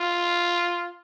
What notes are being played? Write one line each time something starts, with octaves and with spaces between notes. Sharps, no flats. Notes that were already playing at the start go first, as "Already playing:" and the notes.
Already playing: F4